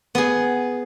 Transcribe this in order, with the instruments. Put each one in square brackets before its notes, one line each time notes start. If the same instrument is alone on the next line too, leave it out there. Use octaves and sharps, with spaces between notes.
[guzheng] B3 G#4